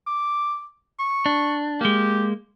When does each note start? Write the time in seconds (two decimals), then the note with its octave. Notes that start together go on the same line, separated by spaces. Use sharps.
0.07 D6
0.99 C#6
1.26 D4
1.81 G#3 A#3 G4